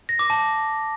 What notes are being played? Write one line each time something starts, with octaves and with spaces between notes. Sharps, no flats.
A#6
D6
A5